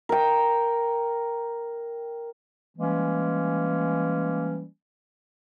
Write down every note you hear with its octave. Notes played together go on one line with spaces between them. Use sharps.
A#4 G5
E3 G3 G#3 A#3 C#4